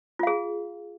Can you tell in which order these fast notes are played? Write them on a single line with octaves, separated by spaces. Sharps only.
F4 F5 G#4